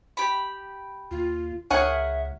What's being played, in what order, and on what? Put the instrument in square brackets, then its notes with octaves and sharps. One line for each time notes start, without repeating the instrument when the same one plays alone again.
[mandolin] G4 B5
[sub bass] D#2 [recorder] F4
[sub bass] C#2 [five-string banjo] G#4 A#4 C#5 [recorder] E5 [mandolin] F#5 F#6